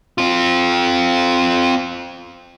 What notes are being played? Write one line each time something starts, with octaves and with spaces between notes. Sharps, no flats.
C4 F4